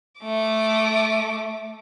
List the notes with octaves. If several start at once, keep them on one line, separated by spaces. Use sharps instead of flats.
A3 D6